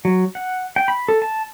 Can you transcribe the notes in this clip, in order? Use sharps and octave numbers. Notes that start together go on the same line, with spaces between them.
F#3
F#5
G5
B5
A4
A5